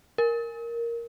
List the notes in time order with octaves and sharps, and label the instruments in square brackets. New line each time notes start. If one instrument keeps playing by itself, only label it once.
[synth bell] A#4